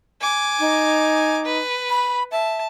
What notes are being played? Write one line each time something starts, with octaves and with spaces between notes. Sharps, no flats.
G#5 D6
D#4
B4
B5
E5 A5